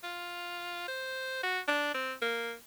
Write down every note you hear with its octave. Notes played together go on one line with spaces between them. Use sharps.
F4
C5
F#4
D4
C4
A#3